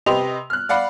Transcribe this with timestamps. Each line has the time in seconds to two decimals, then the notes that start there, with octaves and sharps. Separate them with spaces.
0.06 C3 G4 B4 D#5 C6 F7
0.50 F6 F#6
0.69 D5 F5 F#5 B5